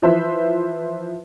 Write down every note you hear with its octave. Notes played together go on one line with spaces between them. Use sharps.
E3 F3 B4 C5 E5